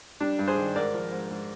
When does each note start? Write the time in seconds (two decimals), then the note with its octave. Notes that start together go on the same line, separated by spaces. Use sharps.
0.20 G3 D4
0.39 G2
0.48 G#4 C5
0.57 D#3
0.76 G#2 A#4 D5
0.94 F3
1.12 G#2
1.30 G#2